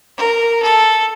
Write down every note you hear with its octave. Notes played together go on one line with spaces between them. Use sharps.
A#4
A4